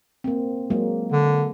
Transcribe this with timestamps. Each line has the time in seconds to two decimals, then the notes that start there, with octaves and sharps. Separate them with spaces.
0.24 A#3 C4
0.70 F#3 G#3 A#3
1.12 D3